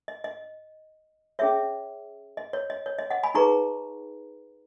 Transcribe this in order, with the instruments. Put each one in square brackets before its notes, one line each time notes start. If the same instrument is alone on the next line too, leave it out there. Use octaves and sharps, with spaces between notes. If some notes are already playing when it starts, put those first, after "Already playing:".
[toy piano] D#5
D#5
C#4 G#4 C#5 E5
D#5
C#5
D#5
C#5
D#5
D#5 F#5
G#5 B5
D#4 G#4 B4 A#5 C#6